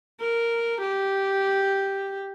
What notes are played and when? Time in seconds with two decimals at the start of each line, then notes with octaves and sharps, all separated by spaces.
0.21 A#4
0.81 G4